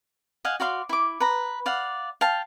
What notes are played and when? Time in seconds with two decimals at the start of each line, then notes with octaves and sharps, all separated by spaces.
0.45 D#5 F5 F#5 G#5
0.60 F#4 D5 F5 C6
0.89 E4 D6
1.20 B4 A#5
1.66 D5 F5 F#5
2.21 F5 G5 A5